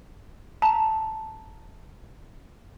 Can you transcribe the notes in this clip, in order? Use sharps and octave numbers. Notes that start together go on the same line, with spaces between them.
A5 A#5